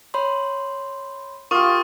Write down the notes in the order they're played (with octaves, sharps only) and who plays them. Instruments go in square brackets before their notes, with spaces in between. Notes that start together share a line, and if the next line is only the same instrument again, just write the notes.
[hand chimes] C#5 B5 C6
[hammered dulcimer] F4 G4 [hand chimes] A#4 [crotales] C#6 D#6 F6